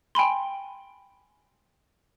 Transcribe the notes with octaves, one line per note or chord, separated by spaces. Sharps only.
G5 G#5 B5 C6